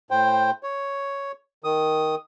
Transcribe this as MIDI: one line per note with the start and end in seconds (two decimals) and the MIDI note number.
0.11 0.51 45
0.11 0.51 72
0.11 0.51 79
0.63 1.32 73
1.64 2.15 51
1.64 2.15 87